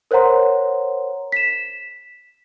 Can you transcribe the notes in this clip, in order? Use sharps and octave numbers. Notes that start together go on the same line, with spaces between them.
A#4 C5 C#5 F#5 A#5 C6
B6 E7